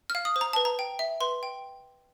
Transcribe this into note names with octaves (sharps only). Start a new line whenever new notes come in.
F6
F5
D#6
C5
A#5
B4 A5
A#5
G5
E5
B4 C6
G5